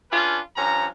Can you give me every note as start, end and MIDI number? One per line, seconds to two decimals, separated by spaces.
0.12 0.39 61
0.12 0.39 62
0.12 0.39 65
0.12 0.39 68
0.12 0.39 71
0.56 0.86 43
0.56 0.86 53
0.56 0.86 61
0.56 0.86 82